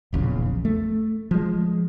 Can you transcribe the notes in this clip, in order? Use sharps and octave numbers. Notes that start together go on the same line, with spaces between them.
E1 A#1 E2 C#3
A3
F3 G#3